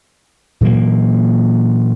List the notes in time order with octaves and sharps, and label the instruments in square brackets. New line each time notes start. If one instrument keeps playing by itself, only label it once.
[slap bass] A#2 E3 F#3 A#3